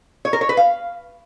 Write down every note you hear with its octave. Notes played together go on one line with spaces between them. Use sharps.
C#5
A#4
C#5
B4
F5